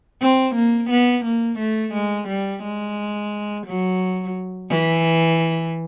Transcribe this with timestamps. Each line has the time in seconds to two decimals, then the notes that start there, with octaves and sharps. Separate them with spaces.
0.21 C4
0.55 A#3
0.90 B3
1.25 A#3
1.59 A3
1.93 G#3
2.28 G3
2.63 G#3
3.66 F#3
4.70 E3